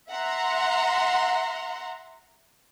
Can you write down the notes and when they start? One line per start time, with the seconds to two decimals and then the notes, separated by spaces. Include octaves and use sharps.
0.12 E5 F#5 A#5 C6